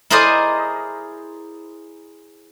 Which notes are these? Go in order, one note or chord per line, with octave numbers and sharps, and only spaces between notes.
E4 G#4 A#4 C5 D5 D#5